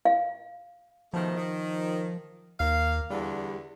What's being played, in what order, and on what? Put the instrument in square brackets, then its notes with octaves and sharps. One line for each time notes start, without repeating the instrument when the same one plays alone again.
[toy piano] F5
[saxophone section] B2 D#3 A3 [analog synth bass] F3
[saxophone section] D#3
[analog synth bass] D#2 [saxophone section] A#3 F5
[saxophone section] E2 D3 [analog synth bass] G3